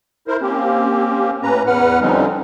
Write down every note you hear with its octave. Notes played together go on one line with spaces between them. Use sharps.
E4 A#4 C5
A#3 C4 C#4 G4
A2 C#4 B4 A#5
E2 B4 F#5 F6
D3 F3 G3 C4 C#4 D#4